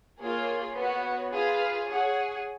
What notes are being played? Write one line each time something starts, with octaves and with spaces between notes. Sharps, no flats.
A#3 F4 G#4 C#5
B3 F#4 C#5
F4 G#4 B4 F5
G#4 C#5 F#5